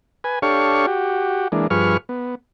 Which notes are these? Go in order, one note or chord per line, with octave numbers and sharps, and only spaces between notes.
B4 G#5
D4 G4 A4 C#5 F5 C#6
F#4 G4
E3 G#3 A#3 D4
G2 F3 G#4 B4 C#6 F6
B3